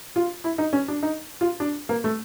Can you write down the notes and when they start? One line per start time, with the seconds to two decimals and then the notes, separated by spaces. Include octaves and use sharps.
0.16 F4
0.44 E4
0.58 D#4
0.73 C#4
0.88 D4
1.03 D#4
1.41 F4
1.60 D4
1.89 A#3
2.04 A3